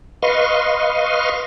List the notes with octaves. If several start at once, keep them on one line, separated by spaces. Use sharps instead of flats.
B4 D#5 F5 C6 C#6